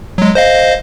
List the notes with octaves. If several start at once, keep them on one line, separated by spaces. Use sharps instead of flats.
F#3 G#3
C5 D#5 F5